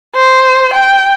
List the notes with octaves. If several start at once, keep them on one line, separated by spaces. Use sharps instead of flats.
C5
G5